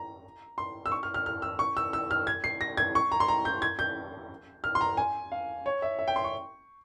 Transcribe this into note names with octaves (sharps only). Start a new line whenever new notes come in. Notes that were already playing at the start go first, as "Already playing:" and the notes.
Already playing: A#5
C6
E6
C#6
F6
F6
F6
E6
C#6
E6
E6
F6
G#6
C7
A#6
G#6
C#6
A#5
C6
A#5
G6
G#6
G6
F6
C6
A#5
G#5
F5
C#5
E5
E5
G5
C6
C#6